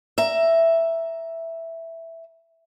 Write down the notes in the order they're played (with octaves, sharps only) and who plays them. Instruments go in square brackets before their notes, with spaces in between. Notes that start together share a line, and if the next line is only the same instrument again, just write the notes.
[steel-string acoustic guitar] E5 A#5